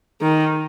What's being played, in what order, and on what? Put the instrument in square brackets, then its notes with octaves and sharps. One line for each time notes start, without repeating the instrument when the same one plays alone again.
[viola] D#3